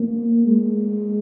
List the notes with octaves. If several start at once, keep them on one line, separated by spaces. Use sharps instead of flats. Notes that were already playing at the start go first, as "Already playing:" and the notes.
Already playing: A#3
G#3